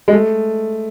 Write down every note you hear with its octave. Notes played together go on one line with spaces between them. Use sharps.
G#3
A3